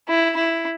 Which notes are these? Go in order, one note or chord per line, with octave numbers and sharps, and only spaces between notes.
E4
E4